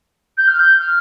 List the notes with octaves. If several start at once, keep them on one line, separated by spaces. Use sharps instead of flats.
G6
F6
G6
F6